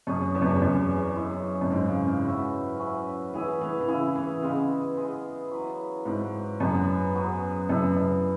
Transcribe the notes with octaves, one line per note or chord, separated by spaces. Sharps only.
F#2 C#4 G#4 C#5
E2
F#2
E2
F#2 C#4 G#4 C#5
G#3 E4 C#5
F#2
G#2 G#3 E4 C#5
C#3
C#3
C#4 F#4 B4 E5
C#4 F#4 B4 E5
E3 E4 G#4 E5
E3
E3
C#3 E4 G#4 E5
E3
C#3 G#3 B3 G#4
G#3 B3 G#4
F#3 E4 B4
G#2 F#3 E4 B4
F#2 F#3 B3 G#4 B4
F#3 B3 G#4 B4
F#2 E4 G#4 E5
F#2